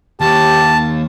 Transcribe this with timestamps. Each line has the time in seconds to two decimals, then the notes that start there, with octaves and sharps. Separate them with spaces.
0.20 D#2 G4 A5